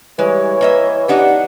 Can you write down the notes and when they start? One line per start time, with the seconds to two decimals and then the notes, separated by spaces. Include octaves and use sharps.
0.19 E3 G3 G#3 C#5
0.61 A#3 B4 D#5 E5
1.08 B3 D4 D#4 G4 F#5